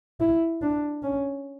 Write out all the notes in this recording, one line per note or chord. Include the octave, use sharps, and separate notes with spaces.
E4
D4
C#4